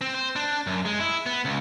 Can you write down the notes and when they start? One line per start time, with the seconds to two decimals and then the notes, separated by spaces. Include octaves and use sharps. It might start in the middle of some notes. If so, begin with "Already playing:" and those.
0.01 C4
0.14 C5
0.36 D4
0.67 F#2
0.85 G#3
1.00 E4
1.26 B3
1.45 C#2